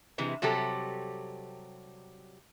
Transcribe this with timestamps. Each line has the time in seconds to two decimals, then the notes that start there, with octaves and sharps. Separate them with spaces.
0.18 C3 E3 G#3
0.42 C3 F#3 G3 G4 A4